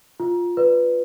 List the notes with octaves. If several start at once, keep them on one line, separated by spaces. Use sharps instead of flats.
F4
B4 D5